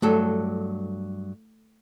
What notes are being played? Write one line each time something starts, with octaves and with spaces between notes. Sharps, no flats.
G2 F#3 A3 A4